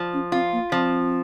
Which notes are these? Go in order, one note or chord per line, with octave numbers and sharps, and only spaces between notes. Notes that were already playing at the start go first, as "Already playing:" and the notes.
Already playing: F3
C#4
C4 F4
A#3
F3 C4